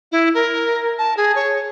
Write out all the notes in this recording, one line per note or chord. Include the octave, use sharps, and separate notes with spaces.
E4
A#4
A5
G#4
C#5